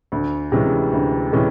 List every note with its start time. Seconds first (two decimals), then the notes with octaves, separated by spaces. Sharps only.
0.12 D2
0.52 C3 E3 G#3 C#4
0.92 D2
1.32 C3 E3 G#3 C#4